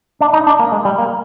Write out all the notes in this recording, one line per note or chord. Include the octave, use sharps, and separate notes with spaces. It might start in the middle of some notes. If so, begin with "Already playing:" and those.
D4
D#4
D4
A#3
G#3
G3
A#3